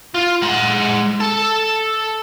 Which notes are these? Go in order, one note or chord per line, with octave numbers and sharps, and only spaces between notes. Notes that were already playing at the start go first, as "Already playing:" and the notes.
F4
G#3 F#5
A4 A5